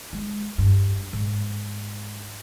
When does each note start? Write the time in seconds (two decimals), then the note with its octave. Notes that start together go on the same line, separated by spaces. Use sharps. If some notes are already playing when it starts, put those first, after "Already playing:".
0.13 G#3
0.58 G2
1.13 G#2